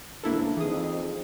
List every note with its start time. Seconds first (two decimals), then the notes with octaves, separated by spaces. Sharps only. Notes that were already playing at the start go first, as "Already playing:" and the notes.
0.23 G#2 C#3 E3 A#3 D4 E4 A4
0.57 F2 E3 D4 D#4 G#4 D#6